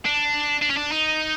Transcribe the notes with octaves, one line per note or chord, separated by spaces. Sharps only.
D4
D4
C#4
D4
D#4